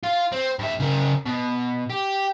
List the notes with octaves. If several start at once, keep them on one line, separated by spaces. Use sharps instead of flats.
F4 F5
C4
G2 E5
C#3 A#4
B2
G4